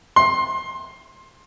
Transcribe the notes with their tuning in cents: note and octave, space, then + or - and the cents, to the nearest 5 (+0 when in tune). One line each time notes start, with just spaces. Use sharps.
C6 +20